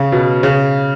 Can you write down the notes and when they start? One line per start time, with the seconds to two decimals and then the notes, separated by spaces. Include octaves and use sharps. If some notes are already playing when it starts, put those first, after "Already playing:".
Already playing: C#3
0.12 B2
0.43 C#3